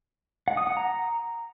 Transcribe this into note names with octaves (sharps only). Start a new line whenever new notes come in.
F#5
D#6
F#5
A#5